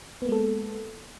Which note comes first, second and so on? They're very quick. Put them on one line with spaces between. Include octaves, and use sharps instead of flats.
B3 A#3 G#3 A4